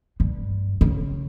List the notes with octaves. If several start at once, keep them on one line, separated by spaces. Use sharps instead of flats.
G2
C#3